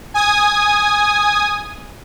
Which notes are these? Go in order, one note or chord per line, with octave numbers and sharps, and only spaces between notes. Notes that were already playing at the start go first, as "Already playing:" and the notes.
G#5 D#6